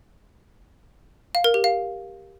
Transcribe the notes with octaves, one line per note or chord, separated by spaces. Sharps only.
F5
A#4
G4
F5